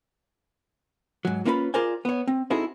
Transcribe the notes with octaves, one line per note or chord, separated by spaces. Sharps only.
G#2 F#3
A#3 C#4 E4 F4 B4 B5
F4 G#4 A#4 C5 D5 G#5
B3 C#5
C4
C4 D#4 E4 F#4 G#4 A4